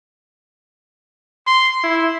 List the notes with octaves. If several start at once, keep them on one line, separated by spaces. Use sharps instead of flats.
C6
E4